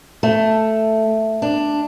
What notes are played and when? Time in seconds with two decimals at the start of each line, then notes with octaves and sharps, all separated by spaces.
0.23 A3
1.42 D4